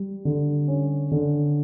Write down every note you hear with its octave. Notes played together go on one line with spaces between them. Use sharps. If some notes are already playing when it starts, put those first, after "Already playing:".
Already playing: G3
D3
C#4
D3